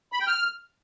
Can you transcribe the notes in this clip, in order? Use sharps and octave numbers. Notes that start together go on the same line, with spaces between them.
B5
G5
F6